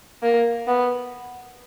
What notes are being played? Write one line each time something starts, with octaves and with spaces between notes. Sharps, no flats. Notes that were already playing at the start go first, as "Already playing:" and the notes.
A#3
B3